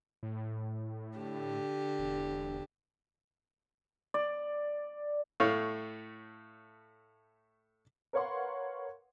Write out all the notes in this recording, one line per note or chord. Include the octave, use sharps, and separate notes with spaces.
A2
D3 G4
E1
D5
A2 A3 C#5 F5
A#4 B4 C#5 F5 F#5 C6